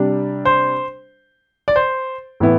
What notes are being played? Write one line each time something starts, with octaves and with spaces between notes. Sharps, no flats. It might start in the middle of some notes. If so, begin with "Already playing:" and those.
Already playing: C3 G3 D4
C5
D5
C5
A2 E3 B3 E4